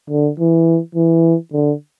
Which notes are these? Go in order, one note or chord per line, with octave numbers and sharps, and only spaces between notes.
D3
E3
E3
D3